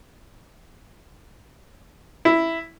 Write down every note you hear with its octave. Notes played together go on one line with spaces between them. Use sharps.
E4